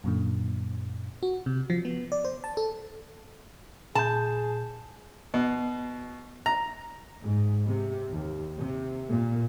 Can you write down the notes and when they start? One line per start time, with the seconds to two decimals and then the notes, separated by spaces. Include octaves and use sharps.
0.04 F#2 A#2 D3
1.23 F#4
1.46 C3
1.70 F3
1.85 B3
2.12 D5
2.25 C5
2.44 A5
2.57 A4
3.95 A#2 G#4 A5 G6
5.34 B2
6.46 A#5
7.21 G#2
7.67 C3
8.12 D#2
8.59 C3
9.09 A#2